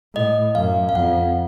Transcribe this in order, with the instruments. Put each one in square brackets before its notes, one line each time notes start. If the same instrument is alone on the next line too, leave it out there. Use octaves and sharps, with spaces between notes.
[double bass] A2 [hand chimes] D#5
[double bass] F#2 [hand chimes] F5
[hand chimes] F5
[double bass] F2 [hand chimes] F#5